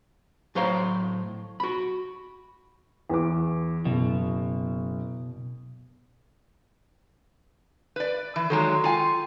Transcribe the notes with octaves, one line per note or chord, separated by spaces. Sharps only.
A2 F#3 C5 F5 A#5
F#4 B5
E2 B4 D6
F#1 B2
B4 D5
E3
D#3 F#3 G#3 A4 A#5
F4 G5 G#5 C6